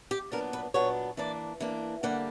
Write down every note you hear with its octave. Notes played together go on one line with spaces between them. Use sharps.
G4
A#2 F#3 B3 D4 A#4
B4
A#2 F#3 B3 D4 C#5
E3 A#3 D4 D5
E3 A#3 D4
D3 G3 A#3 F#5